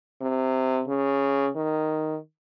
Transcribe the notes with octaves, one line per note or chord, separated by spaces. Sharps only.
C3
C#3
D#3